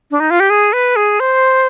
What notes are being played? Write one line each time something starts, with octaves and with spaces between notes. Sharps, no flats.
D4
D#4
F4
G4
G#4
B4
G#4
C5